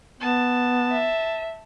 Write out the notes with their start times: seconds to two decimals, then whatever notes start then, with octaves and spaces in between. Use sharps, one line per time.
0.21 B3 A5
0.92 E5